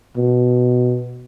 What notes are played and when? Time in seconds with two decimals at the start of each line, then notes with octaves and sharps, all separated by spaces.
0.17 B2